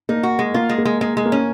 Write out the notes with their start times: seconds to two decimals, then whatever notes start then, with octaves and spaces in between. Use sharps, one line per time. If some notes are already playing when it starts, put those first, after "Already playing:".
0.09 A#3 D#4
0.23 F#4
0.39 G#3
0.54 A#3 F4
0.69 G#3
0.78 A#3
0.85 G#3
1.01 G#3 A#3
1.17 G#3
1.26 A#3
1.32 C#4